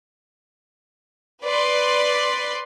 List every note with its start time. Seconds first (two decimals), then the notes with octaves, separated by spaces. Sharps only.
1.44 B4 D5 C6